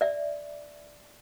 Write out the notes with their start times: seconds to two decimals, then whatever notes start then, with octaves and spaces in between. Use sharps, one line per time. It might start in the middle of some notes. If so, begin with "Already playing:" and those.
0.01 D5 E5